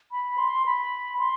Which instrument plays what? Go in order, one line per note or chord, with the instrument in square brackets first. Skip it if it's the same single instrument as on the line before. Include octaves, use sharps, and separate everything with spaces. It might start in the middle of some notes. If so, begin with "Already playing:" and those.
[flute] B5
C6
B5
C6